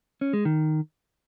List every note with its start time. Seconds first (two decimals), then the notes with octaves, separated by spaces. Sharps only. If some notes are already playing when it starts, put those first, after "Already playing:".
0.21 C#4
0.33 G#3
0.45 D#3